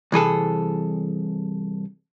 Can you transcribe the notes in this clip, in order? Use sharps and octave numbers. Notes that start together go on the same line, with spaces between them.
C2 E3 G#4 A4